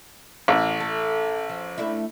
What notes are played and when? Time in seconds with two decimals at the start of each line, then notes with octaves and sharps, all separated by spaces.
0.48 A1
0.80 A4
1.49 F3
1.78 A3 D4 E4